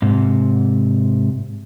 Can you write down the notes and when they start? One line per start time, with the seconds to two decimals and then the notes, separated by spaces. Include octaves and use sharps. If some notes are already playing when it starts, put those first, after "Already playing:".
0.02 G#2 C3